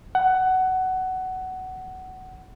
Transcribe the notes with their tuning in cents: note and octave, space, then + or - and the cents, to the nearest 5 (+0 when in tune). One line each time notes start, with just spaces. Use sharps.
F#5 +15